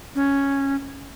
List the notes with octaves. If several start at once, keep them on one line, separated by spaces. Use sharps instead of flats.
C#4